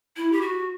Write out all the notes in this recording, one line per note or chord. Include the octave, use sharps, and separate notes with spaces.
E4
G4
F#4